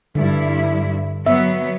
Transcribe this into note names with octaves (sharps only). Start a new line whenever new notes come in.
G2 D3 E4
F#3 B3 E5